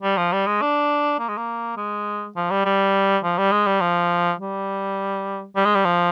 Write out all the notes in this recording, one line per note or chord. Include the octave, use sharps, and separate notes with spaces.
G3
F3
G3
G#3
D4
A#3
G#3
A#3
G#3
F3
G3
G3
F3
G3
G#3
G3
F3
G3
G3
G#3
G3
F3